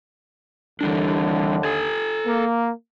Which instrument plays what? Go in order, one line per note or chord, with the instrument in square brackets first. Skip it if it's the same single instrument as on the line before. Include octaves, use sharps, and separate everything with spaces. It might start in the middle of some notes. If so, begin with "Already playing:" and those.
[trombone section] D#2 D3 [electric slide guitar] E3 G3 D4
[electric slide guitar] A4 G#5
[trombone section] A#3